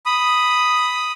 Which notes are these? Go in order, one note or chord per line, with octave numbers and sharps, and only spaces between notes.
B5 D#6